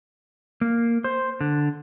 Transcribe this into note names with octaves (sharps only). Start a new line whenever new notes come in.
A#3
C5
D3